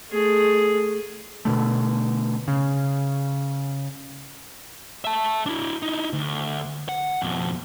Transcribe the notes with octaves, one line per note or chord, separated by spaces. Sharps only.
A3 G#4
B2 D3 A3
C#3
E5 A5
D4 E4
D#4 E4
D2
F#5
F2 B2